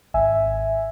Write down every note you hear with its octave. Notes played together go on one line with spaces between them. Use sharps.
G#1 E5 G#5